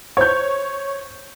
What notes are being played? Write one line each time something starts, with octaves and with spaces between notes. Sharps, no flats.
C5 C#5 G6